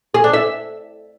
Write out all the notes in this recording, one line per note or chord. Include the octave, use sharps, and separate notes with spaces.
G#4
D4
E5